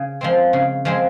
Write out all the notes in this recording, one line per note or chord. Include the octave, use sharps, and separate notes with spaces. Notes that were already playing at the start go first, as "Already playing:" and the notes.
Already playing: C#3
F3 G#3 C4
C#3
F3 G#3 C4